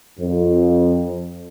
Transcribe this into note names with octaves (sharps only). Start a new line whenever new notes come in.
F2